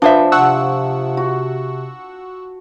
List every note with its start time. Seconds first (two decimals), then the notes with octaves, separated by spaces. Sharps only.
0.02 F3 D4 B4 C5 E5
0.32 C3 F#5 A5 C#6 E6
1.17 F#4